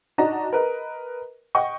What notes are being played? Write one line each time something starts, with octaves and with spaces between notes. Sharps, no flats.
D4 D#4 F#4 D#5 A#5
A#4 B4 D#5
D#5 F#5 G5 C#6